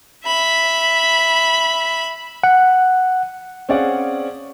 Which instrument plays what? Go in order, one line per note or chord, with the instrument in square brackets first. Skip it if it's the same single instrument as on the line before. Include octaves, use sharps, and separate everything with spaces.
[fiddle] E5 B5
[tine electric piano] F#5
[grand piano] C4 C#4 G#4 D5 F5 F#5